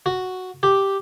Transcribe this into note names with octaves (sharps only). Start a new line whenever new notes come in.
F#4
G4